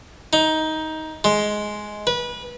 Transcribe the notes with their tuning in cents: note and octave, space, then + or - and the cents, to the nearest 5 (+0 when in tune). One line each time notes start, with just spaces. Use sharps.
D#4 +15
G#3 +10
B4 -25